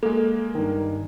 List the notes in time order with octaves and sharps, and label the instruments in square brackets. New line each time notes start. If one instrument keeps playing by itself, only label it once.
[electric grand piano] G#3 A#3 [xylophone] A4
[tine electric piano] G2 D#3